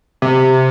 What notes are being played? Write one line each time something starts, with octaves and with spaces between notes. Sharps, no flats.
C3